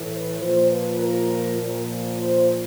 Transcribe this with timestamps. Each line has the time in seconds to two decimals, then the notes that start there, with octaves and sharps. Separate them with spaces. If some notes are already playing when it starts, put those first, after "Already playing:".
Already playing: A2 E3
0.11 B4
0.40 A#2 F3 C5
0.70 B4
0.99 A#4
1.59 A#2 F3
2.18 C5